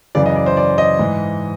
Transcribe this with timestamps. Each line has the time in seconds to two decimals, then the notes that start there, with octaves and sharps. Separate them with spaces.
0.15 F#2 C#3 E3 D5
0.26 D#5
0.36 D5
0.46 C5
0.57 D5
0.78 D#5
0.99 G#2 E3